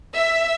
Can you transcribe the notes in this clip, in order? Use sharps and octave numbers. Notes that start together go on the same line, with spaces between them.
E5